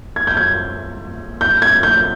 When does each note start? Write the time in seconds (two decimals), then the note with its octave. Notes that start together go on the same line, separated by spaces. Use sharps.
0.16 G#6
0.27 G6
0.37 G#6
1.41 G6
1.62 G#6
1.83 G6